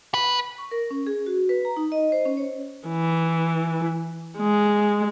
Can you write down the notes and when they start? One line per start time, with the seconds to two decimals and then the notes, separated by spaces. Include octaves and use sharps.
0.14 B4
0.58 C#6
0.71 A#4
0.91 C#4
1.07 G#4
1.26 F#4
1.49 B4
1.65 A#5
1.77 D#4
1.92 D#5
2.12 C5
2.26 C#4
2.37 C#5
2.88 E3
4.38 G#3